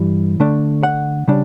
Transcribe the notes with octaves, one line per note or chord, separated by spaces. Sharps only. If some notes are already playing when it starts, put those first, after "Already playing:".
Already playing: G2 E3 G3
D3 A3 D4
F#5
C#3 G3 D4